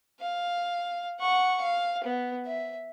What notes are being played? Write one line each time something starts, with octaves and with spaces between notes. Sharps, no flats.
F5
F#5 C#6
F5
B3
E5